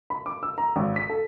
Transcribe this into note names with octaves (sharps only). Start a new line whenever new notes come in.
B5
D6
E6
A#5
G#1
B6
A4